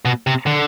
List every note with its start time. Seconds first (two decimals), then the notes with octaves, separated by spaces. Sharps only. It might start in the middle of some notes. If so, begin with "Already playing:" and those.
0.05 B2
0.27 C3
0.47 D3